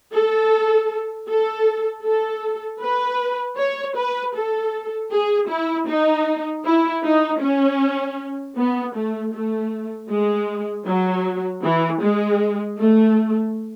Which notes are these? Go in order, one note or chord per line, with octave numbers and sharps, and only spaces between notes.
A4
A4
A4
B4
C#5
B4
A4
G#4
E4
D#4
E4
D#4
C#4
B3
A3
A3
G#3
F#3
E3
G#3
A3